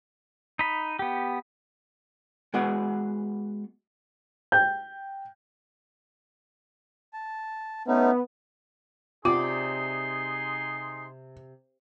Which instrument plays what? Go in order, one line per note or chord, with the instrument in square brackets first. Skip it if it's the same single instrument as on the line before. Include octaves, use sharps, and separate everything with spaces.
[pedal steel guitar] D#4 B5
B3 G4
[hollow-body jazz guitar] G#3 B3 F#4 G#4 B4 F#5
[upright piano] G5 G6
[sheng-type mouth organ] A5
[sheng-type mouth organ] A3 C#4 D#4 [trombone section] B3
[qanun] C3 D5 [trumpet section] D#4 G#4 C6 [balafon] F4 [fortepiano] D6